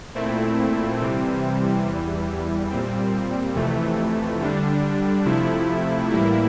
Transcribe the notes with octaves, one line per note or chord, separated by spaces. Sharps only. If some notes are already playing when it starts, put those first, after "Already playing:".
A#2 A3 C4 E4
C3 E3 G3 C4
E2 E3 G3
A#2 G3 C4
F2 C3 E3 A3
D3 G3 D4
C3 F3 A3 E4
A2 E3 G3 A#3 E4